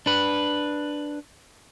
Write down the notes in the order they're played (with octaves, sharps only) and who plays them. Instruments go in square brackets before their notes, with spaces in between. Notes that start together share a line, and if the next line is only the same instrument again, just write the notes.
[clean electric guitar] D4 B4